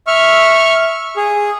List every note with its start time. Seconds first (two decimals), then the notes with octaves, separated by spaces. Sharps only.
0.07 E5 C#6 F6
1.17 G#4